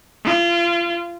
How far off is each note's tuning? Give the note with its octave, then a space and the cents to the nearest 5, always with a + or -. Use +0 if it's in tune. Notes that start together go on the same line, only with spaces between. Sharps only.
F4 -30